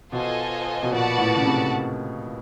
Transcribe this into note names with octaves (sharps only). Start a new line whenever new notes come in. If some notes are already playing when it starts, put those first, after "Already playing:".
B2 F4 A4 C5 D#5 G#5
B2
A#2 F#4 B4 D5 F#5 A5
A2
C#3
C3